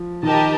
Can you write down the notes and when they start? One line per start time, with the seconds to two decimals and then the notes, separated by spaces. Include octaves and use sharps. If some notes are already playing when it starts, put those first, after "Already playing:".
Already playing: F3
0.23 D#3 G4 A#4 D#5 A5